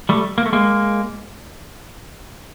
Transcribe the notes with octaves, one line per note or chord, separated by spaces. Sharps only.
G3 A3
A#3
A3
G#3 A#3